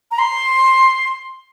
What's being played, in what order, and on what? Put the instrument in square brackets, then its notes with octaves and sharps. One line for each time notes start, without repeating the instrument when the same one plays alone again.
[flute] A#5
C6